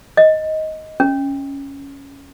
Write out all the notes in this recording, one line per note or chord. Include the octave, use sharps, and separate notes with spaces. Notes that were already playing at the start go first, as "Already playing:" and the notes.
D#5
C#4